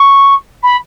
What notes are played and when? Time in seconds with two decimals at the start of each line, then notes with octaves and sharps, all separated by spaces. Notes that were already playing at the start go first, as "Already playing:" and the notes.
Already playing: C#6
0.62 B5